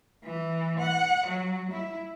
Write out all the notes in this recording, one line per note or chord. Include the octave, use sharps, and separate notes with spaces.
E3
F#5
F#3
E4